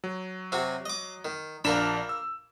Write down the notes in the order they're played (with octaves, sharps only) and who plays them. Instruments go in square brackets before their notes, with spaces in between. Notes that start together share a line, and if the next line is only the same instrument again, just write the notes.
[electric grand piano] F#3
[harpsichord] C3 C4 F#4
D#5 D6
D#3
[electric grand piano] A#1 D4 E7 [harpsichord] A#3 A#4 B5
[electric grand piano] E6